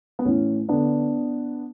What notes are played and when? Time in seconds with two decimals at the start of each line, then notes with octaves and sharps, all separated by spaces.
0.19 B3
0.25 A2 E3 C#4
0.69 D3 B3 D4